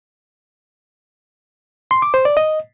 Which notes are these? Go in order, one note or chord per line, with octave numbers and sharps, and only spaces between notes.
C6
D6
C5
D5
D#5